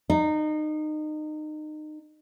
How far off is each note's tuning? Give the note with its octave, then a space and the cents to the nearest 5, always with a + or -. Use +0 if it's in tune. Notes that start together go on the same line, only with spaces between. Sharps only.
D#4 -25